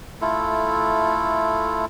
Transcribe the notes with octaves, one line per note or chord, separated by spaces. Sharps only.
A3 E4 F4 A4